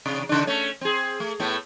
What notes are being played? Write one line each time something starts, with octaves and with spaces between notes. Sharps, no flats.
C3
C#3 D4
A3 C#4
C4 G#4
A3
A2 A3 B3